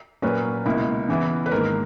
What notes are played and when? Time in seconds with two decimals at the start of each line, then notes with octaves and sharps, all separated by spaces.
0.22 A#2 F#3 A#3 C#4 B4
0.65 C#2 B2 A#3 E4
1.08 C#3 E3 B3 E4
1.46 B4
1.51 G#2 D#3 A#3 A#4